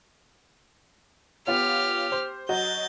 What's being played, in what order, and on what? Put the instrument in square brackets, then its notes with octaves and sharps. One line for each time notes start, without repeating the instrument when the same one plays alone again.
[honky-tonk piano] B3 F4 C#5 [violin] G4 F6
[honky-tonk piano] C5
[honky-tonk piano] F#3 F#4 D#5 [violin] G6 A6